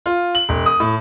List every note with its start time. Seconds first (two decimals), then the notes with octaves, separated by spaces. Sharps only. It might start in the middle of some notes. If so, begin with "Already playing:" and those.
0.06 F4
0.35 F#7
0.49 E1
0.66 D#6
0.80 A2